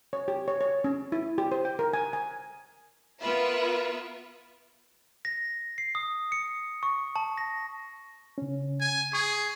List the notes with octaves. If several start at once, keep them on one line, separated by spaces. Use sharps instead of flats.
C#5
G4
C#5
C#5
C#4
E4
G4
C5
G5
A#4
G#5
G#5
B3 F4 A#4 B4 E5
A#6
C7
D#6
C#7
C#6
A5
A#6
C#3 C#4
G#5
G#4 C#6